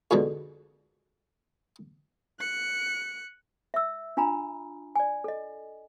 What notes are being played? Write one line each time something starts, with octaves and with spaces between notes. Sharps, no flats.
F2 G#2 B2 D3
F#6 C#7
E5 E6
D4 F4 G#5 A#5 B5
D5 G#5
A4 D#5